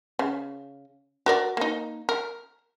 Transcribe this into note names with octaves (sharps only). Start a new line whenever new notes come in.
C#3
F#4 A#4 D5
A#3 D#4
A#4